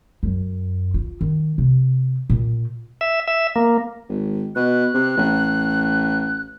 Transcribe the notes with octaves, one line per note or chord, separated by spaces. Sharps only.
F#2
F4
D#3
C3
A#2
E5
E5
A#3
G#1
B2 F#6
C3
A1